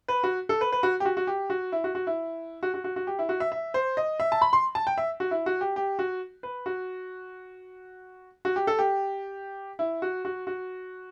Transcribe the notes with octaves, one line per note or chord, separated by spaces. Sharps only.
B4
F#4
A4
B4
B4
F#4
G4
F#4
F#4
G4
F#4
E4
F#4
F#4
E4
F#4
F#4
F#4
F#4
G4
E4
F#4
E5
E5
C5
D#5
E5
A5
B5
C6
A5
G5
E5
F#4
E4
F#4
G4
G4
F#4
B4
F#4
F#4
G4
A4
G4
E4
F#4
F#4
F#4